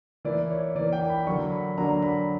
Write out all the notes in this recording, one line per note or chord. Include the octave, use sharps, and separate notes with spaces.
E3 A#3 E4 D5
C#5
E3 A#3 E4 D5
G5
B5
D3 F#3 A#3 D4 C#6
B5
D3 F#3 A#3 D4 A#5
B5